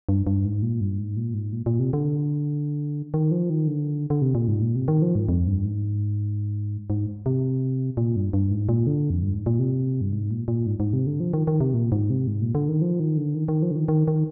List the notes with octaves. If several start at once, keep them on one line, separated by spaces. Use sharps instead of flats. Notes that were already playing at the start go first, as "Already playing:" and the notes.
G2
G2
G#2
A#2
G2
G#2
A#2
G#2
A#2
A#2
C3
D3
D#3
F3
D#3
D3
D3
C3
A#2
G#2
A#2
C3
D#3
F3
G#2
F2
G2
G#2
G#2
C3
A#2
G2
G2
G#2
A#2
D3
F2
G2
G#2
A#2
C3
G2
G#2
A#2
A#2
G#2
G#2
C3
D3
F3
D#3
D#3
C3
A#2
G#2
C3
G#2
A#2
D3
D#3
F3
D#3
D3
D#3
D#3
F3
D3
D#3
D#3
D#3